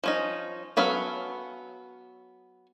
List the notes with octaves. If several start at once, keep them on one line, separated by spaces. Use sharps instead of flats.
F3 C#4 D#4
F#3 B3 C#4 A4 F5